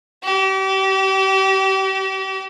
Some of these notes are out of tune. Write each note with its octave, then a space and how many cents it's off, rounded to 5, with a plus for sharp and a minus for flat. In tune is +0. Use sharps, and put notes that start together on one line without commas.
G4 -35